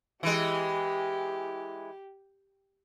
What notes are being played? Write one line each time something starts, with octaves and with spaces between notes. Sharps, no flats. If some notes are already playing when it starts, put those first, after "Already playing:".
E3 G#3 G4